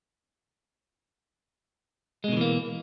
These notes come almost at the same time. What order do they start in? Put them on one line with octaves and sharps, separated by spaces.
G#3 B2 D#3 E3 A#3